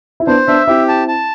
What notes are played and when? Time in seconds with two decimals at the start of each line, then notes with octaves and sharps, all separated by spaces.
0.20 E4
0.27 B3 D4 C5
0.47 B3 D4 E5
0.67 C4 E4 G4
0.89 A5
1.08 A5